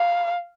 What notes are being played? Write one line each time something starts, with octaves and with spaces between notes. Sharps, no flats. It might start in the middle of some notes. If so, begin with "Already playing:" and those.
Already playing: F5